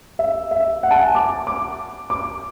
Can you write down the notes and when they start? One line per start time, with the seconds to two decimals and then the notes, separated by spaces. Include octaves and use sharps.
0.19 E5
0.51 E5
0.83 F#5
0.91 A5
0.99 G#5
1.15 D6
1.47 D6
2.10 D6